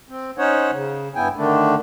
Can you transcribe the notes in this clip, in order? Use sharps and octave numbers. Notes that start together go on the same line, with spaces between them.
C4
C#4 D#4 C5 C#5 F#5
C#3
G2 B3 E4 G5 G#5
D3 D#3 A3 D4